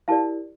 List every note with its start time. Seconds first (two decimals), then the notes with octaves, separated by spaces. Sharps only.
0.08 E4 G4 A#4 D5 F5 A5